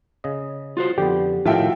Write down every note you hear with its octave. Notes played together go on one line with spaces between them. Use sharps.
C#3 D#5
F4 F#4 C5
F2 D3 B3 G4
A2 D#3 F3 F4 F#4 E5 G5